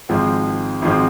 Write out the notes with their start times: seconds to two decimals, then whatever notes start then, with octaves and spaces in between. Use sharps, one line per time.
0.09 G#1 G#2 F3 G#3 C4
0.82 G#1 G#2 F3 G#3 C4